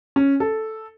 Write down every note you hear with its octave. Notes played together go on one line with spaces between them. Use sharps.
C#4
A4